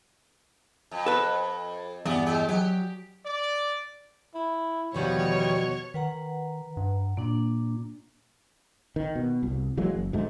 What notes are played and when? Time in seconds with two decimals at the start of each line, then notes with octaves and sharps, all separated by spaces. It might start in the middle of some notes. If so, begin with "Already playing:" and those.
0.91 F2
1.06 A4 B4
2.05 E2 G2 B3 D5
2.26 G#3 G4
2.49 F#3 G4
3.25 D5
4.35 E4
4.94 E2 B2 D#3 F3 G3 C#5
5.94 D#3 B4 F#5 A#5
6.77 G2
7.17 A#2 A#3 D4
8.96 D#3
9.15 B2
9.43 C2
9.77 E3 F#3 G#3 A#3
9.94 F#1
10.13 D2 G#2 G#3 A3